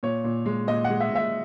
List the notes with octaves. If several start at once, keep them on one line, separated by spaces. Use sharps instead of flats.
A#2 C#5
A#2
G#3
A#2 D#5
F#5
G#3
E5
A#2 E5